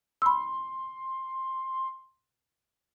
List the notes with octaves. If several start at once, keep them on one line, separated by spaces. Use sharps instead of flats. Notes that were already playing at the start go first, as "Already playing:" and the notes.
B5 C6 E6